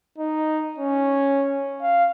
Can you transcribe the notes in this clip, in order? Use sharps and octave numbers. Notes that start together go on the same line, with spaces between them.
D#4
C#4
F5